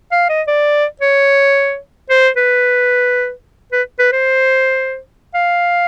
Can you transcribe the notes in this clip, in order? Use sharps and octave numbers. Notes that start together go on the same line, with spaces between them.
F5
D#5
D5
C#5
C5
B4
B4
B4
C5
F5